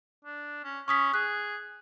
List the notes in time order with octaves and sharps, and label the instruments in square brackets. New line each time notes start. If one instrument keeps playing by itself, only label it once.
[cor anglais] D4
C#4
[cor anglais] C#4 [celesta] C#6 D#6 B6
[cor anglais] G#4 [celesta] F#6